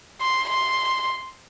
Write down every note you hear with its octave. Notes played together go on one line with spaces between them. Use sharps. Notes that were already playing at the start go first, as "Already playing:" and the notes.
C6
C6